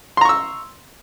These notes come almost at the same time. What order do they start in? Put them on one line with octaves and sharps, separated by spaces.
C6 A#5 C#6 E6